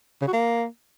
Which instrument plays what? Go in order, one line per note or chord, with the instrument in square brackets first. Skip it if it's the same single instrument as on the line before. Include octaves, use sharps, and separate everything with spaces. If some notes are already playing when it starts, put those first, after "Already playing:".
[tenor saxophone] C#3
F#4
A#3